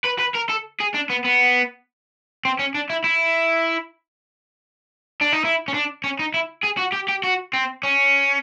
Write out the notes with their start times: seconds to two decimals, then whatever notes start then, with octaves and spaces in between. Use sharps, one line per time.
0.05 B4
0.20 B4
0.35 A#4
0.50 A4
0.80 G#4
0.95 D4
1.10 B3
1.25 B3
2.45 C4
2.59 C#4
2.75 D4
2.90 E4
3.04 E4
5.21 D4
5.33 D#4
5.45 E4
5.68 C#4
5.74 D4
6.04 C#4
6.19 D#4
6.34 E4
6.64 G#4
6.79 F#4
6.93 G4
7.09 G4
7.23 F#4
7.53 C4
7.83 C#4